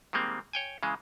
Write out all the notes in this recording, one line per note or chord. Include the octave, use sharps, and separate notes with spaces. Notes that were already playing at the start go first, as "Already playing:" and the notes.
D#3 G3 G#3 A#3 C4
C#5 G5 G#5
C#3 E3 G#3